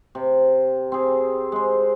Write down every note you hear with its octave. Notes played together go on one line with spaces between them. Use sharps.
C3
C4 G#4
G#3 C5